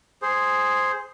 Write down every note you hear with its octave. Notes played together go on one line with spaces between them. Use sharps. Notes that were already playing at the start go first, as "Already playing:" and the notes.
G#4 C5